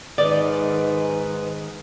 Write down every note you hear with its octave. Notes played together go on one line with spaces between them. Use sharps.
G#2 D#3 B4 D5